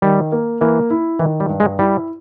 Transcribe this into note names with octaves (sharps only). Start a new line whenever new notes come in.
D#3 G3
A#3
E3 A#3
E4
D#3 E3
G3
G2
G#3
G3 E4